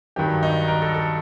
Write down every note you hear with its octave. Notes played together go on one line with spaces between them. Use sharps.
G2 D#3 F#3 G4
D#4
A#4
A4
A4